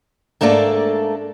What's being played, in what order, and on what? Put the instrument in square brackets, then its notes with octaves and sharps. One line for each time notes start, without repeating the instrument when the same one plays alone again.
[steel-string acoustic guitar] G#2 A3 A#3 D4 A4